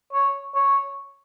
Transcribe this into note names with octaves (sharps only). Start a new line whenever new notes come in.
C#5
C#5